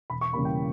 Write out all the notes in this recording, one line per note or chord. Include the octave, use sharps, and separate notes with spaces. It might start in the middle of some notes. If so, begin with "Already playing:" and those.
E1 B5
C#6
E2 C#3 G3 A#3 B5
G5